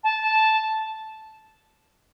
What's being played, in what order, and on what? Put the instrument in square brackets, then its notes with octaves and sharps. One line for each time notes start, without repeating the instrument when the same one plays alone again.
[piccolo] A5